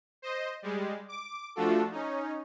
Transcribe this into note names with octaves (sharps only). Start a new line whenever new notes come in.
C5 D#5
G3 G#3
D6
F3 A3 D4 F4 F#4 A4
C#4 D#4